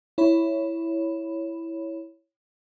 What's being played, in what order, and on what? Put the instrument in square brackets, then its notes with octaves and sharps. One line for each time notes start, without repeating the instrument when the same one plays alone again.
[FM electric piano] E4 C#5 B5